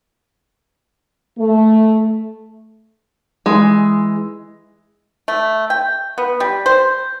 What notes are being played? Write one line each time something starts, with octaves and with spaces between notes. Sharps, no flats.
A3
E3 G#3
A3
G5
B3
G3
C5